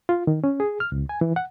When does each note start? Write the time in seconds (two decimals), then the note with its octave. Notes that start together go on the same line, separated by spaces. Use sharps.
0.09 F4
0.27 D#3
0.44 C#4
0.60 G#4
0.80 F6
0.92 C#2
1.09 G#5
1.21 E3
1.36 F#5